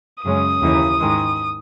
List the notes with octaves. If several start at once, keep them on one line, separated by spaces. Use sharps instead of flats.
F#2 C#3 G#3 C#4 D#6
D#2 C#3 E3 A#3 D#4
G#2 D#3 G#3